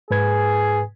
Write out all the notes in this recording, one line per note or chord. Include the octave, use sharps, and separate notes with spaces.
G#2 G#4 B4 G#6